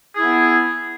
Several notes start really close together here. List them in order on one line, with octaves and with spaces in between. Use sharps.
G#4 E4 B3